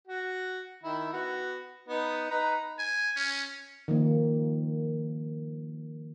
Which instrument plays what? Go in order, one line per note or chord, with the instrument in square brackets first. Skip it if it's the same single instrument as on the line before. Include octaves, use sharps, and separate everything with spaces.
[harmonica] F#4
D#3 E4
B3 F#4
B3 D#4
D#4 B4 A#5
[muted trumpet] G#5
C#4
[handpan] D#3 F3 A#3